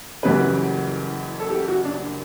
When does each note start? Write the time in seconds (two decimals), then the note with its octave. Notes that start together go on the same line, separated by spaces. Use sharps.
0.23 F#1 F#2 C#3 E3 G3 B4
1.40 A4
1.50 G4
1.68 F#4
1.85 D4